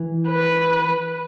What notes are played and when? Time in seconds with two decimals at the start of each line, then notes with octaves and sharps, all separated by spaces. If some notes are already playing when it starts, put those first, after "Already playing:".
Already playing: E3
0.28 B4